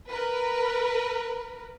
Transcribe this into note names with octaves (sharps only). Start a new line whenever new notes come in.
A#4 B4